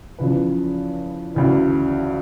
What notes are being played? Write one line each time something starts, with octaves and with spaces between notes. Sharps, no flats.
E2 C#3 F3 B4
D2 C#3 E3